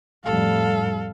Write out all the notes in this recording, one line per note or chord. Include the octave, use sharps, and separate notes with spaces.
F2 A2 G3 A4 F5